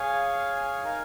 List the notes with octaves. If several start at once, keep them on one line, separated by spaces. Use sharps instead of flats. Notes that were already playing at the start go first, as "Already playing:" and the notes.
Already playing: G#4 C#5 F5 G#5
D#4 A#4 F5 G#5